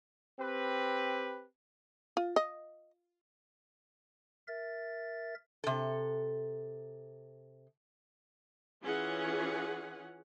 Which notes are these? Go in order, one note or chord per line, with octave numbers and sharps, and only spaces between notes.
C4 G4 B4
F4
D#5
A#4 E5 A6
C3 A4
E3 C#4 F4 G#4 F#5